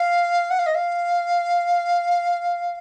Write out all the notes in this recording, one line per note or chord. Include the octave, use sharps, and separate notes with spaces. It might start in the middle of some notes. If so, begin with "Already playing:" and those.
Already playing: F5
F#5
F5
D#5
F5